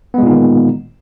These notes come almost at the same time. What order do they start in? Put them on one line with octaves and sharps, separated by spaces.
B3 G#3 A#2 D#4 D#3